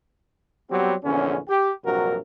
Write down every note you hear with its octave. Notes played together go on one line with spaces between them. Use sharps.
F#3 G3 B3 C4 G4
A#1 E2 D3 C#4
G4
A#1 G2 C3 F#3 F#4 A#4